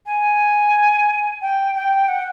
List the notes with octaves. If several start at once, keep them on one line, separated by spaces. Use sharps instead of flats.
G#5
G5
G5
F#5